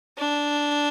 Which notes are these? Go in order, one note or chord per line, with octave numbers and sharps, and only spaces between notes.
D4